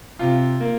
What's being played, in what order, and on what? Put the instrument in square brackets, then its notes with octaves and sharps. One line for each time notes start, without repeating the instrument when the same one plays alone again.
[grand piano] C3 F4
A#3